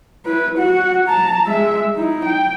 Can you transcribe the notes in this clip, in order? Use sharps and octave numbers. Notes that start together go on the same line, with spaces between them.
E4 B4
F#4 F#5
A5 A#5
G#3 E5
D#4 E4
G5